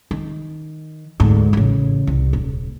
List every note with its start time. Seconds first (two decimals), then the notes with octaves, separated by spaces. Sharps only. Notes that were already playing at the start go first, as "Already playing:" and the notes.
0.11 D#3
1.20 D2 G#2
1.53 A1 C#3
2.07 C2
2.33 D#1